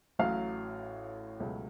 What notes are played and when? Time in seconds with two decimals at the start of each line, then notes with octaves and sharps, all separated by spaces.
0.19 A1 A2 F#3 F5
1.40 C#2 B2 F#3 A3